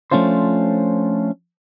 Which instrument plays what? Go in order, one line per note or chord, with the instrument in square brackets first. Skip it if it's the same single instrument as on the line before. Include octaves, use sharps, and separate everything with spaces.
[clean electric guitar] F3 A3 C#4 D4 F4 C5